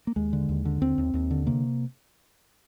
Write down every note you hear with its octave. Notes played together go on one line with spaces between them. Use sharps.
A#3
D#2 G#3
D3
D#2
D3
D#2 C4
D#2
D#2
D3
C3 A#3